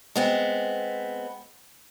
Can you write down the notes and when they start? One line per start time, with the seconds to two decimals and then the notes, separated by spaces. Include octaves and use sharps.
0.16 G#3 B3 C4